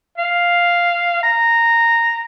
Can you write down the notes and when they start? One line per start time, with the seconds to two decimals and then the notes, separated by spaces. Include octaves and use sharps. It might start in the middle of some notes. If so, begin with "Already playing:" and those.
0.18 F5
1.23 A#5